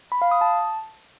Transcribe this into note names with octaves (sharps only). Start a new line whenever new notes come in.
B5
F5
D#6
A5